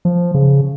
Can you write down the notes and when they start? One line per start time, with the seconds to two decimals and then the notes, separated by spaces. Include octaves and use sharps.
0.05 F3
0.34 C#3